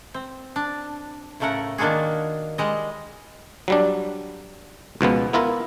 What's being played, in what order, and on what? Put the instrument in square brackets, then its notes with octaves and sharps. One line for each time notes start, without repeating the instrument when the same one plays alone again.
[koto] C4
D4
A2 C#3 A3 A#4 F#5
D#3 A#3 D4 F4 F#4 G#4
G3 G#3 D#5
[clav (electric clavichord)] F#3 G3 D4
C#2 B2 F3 B3
B3 E4 F4 A#4